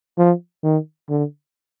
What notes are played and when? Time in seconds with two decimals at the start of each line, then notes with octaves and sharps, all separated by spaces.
0.18 F3
0.63 D#3
1.09 D3